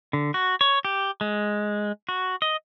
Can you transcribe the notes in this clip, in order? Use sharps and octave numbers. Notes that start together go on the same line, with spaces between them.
D3
F#4
C#5
G4
G#3
F#4
D#5